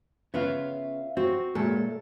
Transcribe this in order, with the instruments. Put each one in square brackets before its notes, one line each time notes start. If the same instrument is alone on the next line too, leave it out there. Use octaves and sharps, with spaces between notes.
[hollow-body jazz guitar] C#3 B3 F4 [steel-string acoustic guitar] E5 F5
[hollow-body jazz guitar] C4 [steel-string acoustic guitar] F#4
[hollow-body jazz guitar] A#2 G#3 A3 [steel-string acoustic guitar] A4